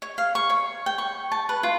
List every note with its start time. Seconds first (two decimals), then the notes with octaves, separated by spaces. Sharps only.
0.02 C#5
0.18 F5
0.35 C#6
0.50 C#5
0.86 G5
0.98 C#6
1.32 A5
1.49 B4
1.63 F4